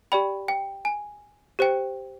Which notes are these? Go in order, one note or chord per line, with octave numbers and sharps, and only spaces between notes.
G4 D5 G5 B5
G5
G#5
G4 C5 G5